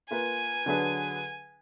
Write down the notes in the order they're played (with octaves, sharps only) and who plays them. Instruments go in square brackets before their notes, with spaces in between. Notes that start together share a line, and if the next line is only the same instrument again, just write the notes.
[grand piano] A#3 F4 B4 [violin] G#5
[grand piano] D3 F#3 D4 G#4 B4